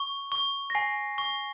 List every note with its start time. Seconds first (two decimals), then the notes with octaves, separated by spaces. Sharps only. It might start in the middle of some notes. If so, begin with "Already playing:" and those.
Already playing: C#6
0.32 C#6
0.70 A#6
0.75 G#5 C7
1.18 C#6